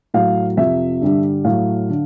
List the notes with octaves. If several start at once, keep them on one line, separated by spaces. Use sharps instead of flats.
A2 F#3 F5
F2 C3 F3 E5
G2 D3 G3
A2 F#3 F5
D3